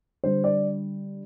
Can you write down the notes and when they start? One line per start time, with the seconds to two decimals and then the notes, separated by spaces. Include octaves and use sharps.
0.24 D3 G3 C5
0.44 D5